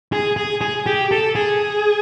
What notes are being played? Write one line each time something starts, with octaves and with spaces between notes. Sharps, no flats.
G#4
G#4
G#4
G4
A4
G#4